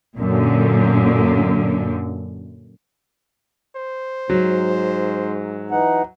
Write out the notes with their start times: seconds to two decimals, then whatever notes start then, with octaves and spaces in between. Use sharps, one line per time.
0.17 F#2 A#2 D3
3.76 C5
4.30 G#2 F#3
5.71 E3 D#4 F#5